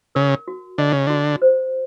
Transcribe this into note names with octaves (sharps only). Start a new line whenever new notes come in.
C#3 A#4
F#4
D3 D#5
C#3
D3 F#4
C5